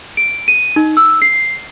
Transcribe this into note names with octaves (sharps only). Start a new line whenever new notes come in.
D7
D#7
D#4
E6
C7